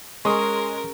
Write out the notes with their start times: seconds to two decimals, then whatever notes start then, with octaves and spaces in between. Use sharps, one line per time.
0.25 G#3 C#4 G#4 A#4 C6 D#6